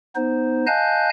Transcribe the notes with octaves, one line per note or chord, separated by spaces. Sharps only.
B3 D#4 C5
D#5 F5 G#5 A5 F#6 G6